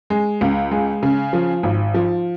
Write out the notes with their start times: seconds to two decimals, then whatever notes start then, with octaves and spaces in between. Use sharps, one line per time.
0.10 G#3
0.41 C#2
0.71 G#3
1.03 C#3
1.33 F3
1.63 G#1
1.94 F3